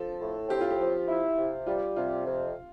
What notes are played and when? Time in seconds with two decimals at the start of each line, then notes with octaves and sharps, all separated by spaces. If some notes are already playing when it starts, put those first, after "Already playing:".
Already playing: F3 A4
0.20 A2
0.49 C4 G4
0.61 F4
0.70 G4
0.79 F3
1.08 E4
1.38 C3
1.66 G3 F4
1.96 C3 F4
2.26 F2